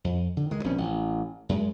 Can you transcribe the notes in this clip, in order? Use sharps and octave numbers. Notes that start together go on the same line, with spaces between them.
F2
D3
D2 D#3 G#3
A#1 B2 C4 C#4
A1
F#2 G#3